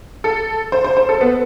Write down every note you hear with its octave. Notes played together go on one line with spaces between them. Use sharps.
A4
C5
C5
C5
A4
B3